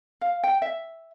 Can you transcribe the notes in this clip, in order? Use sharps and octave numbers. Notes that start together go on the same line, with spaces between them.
F5
G5
E5